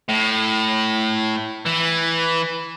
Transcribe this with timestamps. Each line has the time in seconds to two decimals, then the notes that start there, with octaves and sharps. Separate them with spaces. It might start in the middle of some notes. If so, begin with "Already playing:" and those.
0.09 A2
1.66 E3